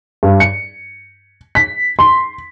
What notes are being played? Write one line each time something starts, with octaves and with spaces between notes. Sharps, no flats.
G2
C#7
B6
C6